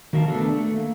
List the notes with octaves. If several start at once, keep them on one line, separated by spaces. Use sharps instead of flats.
D#3 F#4 A#4 E5 F5 A5
A3 B3 D4 G4 A4
A3
A#3